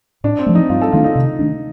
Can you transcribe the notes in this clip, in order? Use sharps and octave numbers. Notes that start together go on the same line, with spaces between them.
A2 D4
C4
F3 A3
D#4
G2 F4
A4
D#3 A3 D4 F4
D#4
C3
D#3 A3 D4